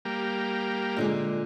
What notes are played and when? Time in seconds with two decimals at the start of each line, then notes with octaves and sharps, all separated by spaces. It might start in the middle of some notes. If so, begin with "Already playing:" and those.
0.05 G3 A#3
0.97 A#2 D3 G#3